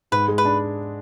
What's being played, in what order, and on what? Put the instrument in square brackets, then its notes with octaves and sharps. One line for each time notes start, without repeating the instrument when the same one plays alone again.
[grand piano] G#2 [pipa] B4
[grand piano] G#3
[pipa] B4
[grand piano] D4